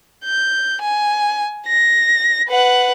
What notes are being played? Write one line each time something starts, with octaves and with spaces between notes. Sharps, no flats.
G6
G#5
A#6
B4 F#5